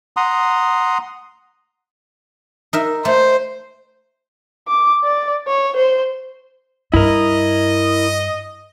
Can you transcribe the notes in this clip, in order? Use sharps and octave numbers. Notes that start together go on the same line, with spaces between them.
F#5 A#5 C6 D#6
D#4 A#4 E5
A3 C5
D6
D5
C#5
C5
G2 E4 A#4 D#5